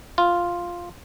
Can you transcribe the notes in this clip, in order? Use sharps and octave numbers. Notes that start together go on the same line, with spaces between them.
F4